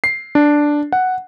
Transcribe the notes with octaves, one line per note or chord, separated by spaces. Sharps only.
C7
D4
F#5